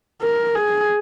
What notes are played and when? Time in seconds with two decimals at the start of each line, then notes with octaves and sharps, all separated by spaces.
0.21 A#4
0.55 G#4